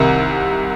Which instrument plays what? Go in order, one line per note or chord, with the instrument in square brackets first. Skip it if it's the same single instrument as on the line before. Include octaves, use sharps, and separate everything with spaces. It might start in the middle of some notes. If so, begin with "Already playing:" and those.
Already playing: [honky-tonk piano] C2 C3 D#3 E5